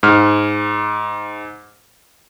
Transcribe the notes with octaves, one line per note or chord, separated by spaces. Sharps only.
G#2 F6